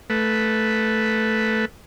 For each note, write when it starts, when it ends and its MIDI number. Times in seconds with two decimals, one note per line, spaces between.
0.10 1.65 57
0.10 1.65 71